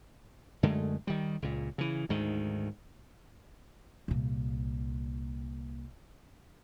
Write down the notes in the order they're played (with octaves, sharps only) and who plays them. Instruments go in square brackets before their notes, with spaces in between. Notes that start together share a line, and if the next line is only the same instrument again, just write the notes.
[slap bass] F#2 D3 G#3 A3
D#3 G3
C#2 A#2
C#3 E3
D2 G#2 D#3
[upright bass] C2 A#2